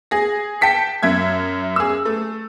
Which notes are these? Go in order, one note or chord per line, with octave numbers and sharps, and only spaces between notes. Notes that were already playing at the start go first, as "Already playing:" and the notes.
G#4 A#6
G5 A5 B6 C#7
F#2 E5 G#6
G#4 E6
A3